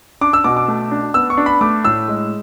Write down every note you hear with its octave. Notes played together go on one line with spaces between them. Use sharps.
D4 D6
E6
B2 D6
D6
A3
D4
B3 E6
C#6
D4
B5
A3 D6
A2 E6
G#3